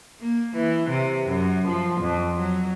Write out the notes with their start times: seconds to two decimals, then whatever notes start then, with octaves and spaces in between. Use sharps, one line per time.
0.21 A#3
0.56 E3
0.90 C3
1.28 F#2
1.68 F3
2.01 F2
2.36 F#3